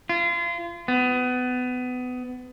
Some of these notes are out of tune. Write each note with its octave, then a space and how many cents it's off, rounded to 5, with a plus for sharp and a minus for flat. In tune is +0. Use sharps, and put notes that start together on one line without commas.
F4 -30
B3 +25